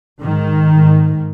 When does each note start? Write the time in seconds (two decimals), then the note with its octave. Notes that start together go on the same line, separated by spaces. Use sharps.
0.21 G#2 D#3
0.71 G#2